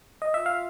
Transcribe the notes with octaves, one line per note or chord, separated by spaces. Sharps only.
D#5
F4 E5
F5